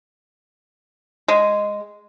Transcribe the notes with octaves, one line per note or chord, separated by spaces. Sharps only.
G#3